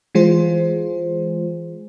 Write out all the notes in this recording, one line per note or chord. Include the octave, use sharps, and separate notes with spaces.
E3 G#3 F4 G#4 C5